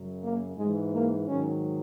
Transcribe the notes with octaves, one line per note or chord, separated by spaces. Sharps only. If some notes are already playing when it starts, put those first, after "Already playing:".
Already playing: F#2 C#3 F#3
A#3
G#2 E3 G#3
A#3
G#2 D#3 F#3 C#4